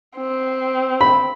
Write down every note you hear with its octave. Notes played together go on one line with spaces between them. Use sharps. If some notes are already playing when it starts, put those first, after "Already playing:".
C4
B5